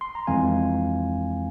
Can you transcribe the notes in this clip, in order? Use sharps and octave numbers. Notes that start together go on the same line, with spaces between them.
C6
A#5
F2 E3 G#3 C4 F5 G#5